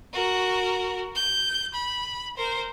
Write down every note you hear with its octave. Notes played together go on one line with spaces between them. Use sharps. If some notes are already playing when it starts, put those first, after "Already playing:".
F#4 A#4
G6
B5
A#4 C5